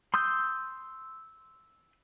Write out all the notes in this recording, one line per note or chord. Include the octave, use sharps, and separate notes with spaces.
C6 D#6 E6 G6